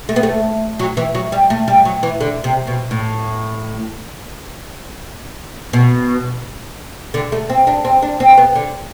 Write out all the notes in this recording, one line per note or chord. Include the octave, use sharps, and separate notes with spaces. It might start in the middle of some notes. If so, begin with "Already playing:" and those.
A3
B3
A3
F#3
E3
F#3
G3
A3
G3
F#3
E3
D3
C3
B2
A2
B2
D3
A3
C4
D4
C4
D4
C4
B3
D3